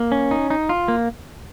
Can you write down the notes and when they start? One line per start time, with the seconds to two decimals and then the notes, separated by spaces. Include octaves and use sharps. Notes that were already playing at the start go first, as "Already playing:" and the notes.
Already playing: A#3
0.12 C#4
0.31 D#4
0.50 D#4
0.69 F4
0.88 A#3